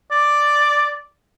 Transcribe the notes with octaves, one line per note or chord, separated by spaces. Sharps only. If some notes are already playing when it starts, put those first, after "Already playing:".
D5